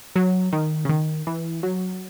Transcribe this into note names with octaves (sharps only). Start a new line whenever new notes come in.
F#3
D#3
C#3
D#3
E3
F#3